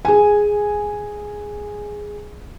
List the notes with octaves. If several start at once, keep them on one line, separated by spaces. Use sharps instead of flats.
G#4 G#5